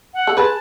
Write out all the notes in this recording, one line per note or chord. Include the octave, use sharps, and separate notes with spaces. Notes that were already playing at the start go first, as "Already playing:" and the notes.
F#5
A4
G#4 B4 A5